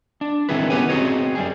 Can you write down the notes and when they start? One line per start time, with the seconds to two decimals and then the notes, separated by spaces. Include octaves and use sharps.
0.21 D4
0.49 D#3 C4 E4 G#4 B4
0.70 B3 C#4 G4 B4 C#5 G#5
0.89 C4 F#4 G#4 C#5 D#5
1.35 F#2 G3 G#4